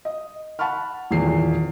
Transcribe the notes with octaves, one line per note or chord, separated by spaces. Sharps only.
D#5
F#5 A5 B5 C#6 F6
D#1 E2 D#3 C7